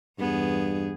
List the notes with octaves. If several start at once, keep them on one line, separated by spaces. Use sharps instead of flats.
E2 G2 B3 G#4